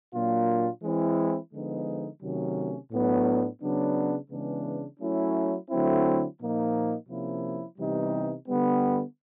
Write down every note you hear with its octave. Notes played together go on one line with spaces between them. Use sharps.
A#2 F#3 A#3 D4 F4
E3 G#3 C4 E4
D3 F3 G#3 B3 D#4
C3 D#3 F#3 A3 C#4
A2 F#3 B3 D4
C#3 F#3 B3 D4
C#3 E3 G#3 B3 D4
F#3 A3 C#4 E4
D3 F#3 A3 C4 E4
A#2 F3 A#3 D#4
C3 F3 A#3 C#4 E4
C3 E3 G3 B3 D#4
D3 G3 B3